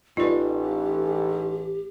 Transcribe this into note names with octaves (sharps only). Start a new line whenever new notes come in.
A1 D#4 F4 G4 B4 D5